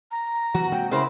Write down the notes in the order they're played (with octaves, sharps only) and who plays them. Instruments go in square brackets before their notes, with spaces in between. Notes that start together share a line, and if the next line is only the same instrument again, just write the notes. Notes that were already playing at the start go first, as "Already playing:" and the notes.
[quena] A#5
[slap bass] E3 [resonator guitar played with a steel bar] F#4
[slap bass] C3 G#3 A#3 [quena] G5
[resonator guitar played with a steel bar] C#3 A#4 C5 [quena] E4